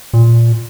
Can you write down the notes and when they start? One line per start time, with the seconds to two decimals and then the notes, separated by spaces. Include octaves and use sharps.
0.13 A#2